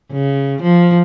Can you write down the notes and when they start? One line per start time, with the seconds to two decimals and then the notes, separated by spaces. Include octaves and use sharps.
0.12 C#3
0.62 F3